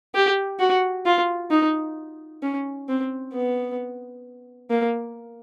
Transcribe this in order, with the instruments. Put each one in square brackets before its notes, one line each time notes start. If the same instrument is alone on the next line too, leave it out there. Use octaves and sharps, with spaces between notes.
[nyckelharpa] G4
F#4
F4
D#4
C#4
C4
B3
A#3